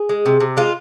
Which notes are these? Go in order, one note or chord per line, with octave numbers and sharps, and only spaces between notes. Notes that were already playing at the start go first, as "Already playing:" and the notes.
Already playing: G#4
G#3
C3
C3
G#3 F4